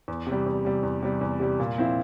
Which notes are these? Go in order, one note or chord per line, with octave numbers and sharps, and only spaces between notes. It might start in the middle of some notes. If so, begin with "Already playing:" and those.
E2
C3
G3
E2
C3 G3
E2
C3 G3
E2
C3 G3
A#2
F3 C4 E4